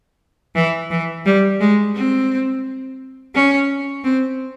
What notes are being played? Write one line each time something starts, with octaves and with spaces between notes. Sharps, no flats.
E3
E3
G3
G#3
C4
C#4
C4